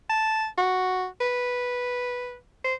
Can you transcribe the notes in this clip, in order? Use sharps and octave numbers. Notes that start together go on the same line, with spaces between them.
A5
F#4
B4
C5